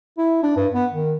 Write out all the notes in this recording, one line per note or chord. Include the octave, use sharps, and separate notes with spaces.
E4
D4
G2
B3
D#3